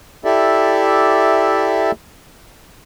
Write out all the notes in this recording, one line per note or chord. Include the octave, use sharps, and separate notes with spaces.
E4 G4 A4 D5 E5